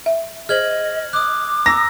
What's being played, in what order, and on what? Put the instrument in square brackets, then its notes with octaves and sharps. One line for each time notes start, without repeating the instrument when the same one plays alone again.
[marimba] E5
[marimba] G#4 C5 [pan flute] D#5 [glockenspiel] F6 G#6 F#7
[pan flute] D6 [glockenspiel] D#6 F#6
[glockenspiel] A#5 E6 [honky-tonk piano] A#6